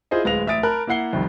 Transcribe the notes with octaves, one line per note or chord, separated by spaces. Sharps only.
E4 F4 G#4 C5 D#5
D1 G#3 B4 F5 A#6 F7
A1 E5 D#6 A6 D7
A#4 A5 B5 F#6
A#3 E4 E5 F#5 C7 G7
C2 F2 D#3